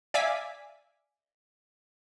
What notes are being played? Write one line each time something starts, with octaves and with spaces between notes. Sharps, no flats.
D5 E5 F5 G#5 D6 B6